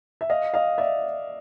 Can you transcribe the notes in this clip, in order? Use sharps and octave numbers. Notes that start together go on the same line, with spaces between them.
E5
D#5 F5
D#5 F5
D5 E5